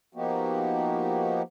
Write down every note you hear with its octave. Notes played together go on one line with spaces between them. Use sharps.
F3 A#3 B3 D#4 F#4 G4